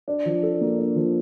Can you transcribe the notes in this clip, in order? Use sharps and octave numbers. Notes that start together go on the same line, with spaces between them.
D4
F3
A4
A#3
D4
F3